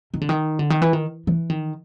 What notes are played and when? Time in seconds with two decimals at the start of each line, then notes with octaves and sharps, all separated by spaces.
0.14 D#3
0.21 D3
0.29 D#3
0.59 D3
0.70 D#3
0.82 E3
0.93 D#3
1.27 E3
1.50 D#3